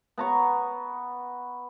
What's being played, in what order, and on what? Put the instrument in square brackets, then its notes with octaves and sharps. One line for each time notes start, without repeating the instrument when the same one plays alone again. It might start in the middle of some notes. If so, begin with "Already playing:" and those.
[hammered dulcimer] B3 A#5 C#6